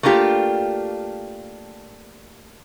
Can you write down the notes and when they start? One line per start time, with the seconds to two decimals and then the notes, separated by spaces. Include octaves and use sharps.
0.03 A3 A#3 D4 F4 G4